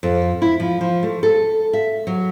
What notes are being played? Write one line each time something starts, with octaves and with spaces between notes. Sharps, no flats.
F2
E4
F3
F3
A3
A4
E5
F#3